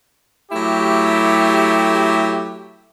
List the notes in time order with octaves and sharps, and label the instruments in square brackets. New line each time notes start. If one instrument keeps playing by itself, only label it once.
[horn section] F#3 A3 E4 G4